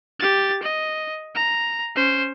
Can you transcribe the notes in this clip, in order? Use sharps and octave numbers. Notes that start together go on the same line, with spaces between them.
G4 A6
D#5
A#5
C#4 C5